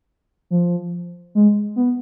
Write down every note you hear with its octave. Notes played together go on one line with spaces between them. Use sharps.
F3
G#3
B3